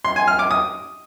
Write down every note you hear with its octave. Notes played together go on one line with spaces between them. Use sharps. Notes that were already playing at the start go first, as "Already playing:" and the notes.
C6
G#5
F6
D6
D#6